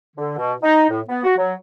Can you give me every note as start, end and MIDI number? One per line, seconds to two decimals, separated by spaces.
0.17 0.34 50
0.38 0.53 47
0.62 0.86 63
0.89 1.00 45
1.08 1.22 59
1.24 1.34 66
1.37 1.53 54